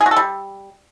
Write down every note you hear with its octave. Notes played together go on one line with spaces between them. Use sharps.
G#4
F#4
A4
G3